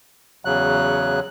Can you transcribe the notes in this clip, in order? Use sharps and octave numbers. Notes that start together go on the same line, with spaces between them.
E2 C#3 F#3 F#6